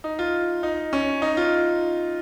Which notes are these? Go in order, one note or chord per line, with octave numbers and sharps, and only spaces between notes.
D#4
F4
D#4
C#4
D#4
F4